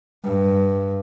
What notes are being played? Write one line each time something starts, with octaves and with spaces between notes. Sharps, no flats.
G2 G3